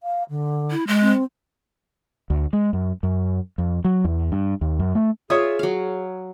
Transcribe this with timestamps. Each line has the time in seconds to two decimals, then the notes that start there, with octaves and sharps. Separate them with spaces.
0.03 F5
0.29 D3
0.71 E4
0.87 G#3
1.01 C4
2.30 D2
2.53 G#3
2.73 F#2
3.03 F#2
3.58 F2
3.85 F#3
4.05 E2
4.32 G2
4.61 D#2
4.79 F#2
4.95 A3
5.30 F4 G#4 C#5 E5 D#6
5.59 F#3 F5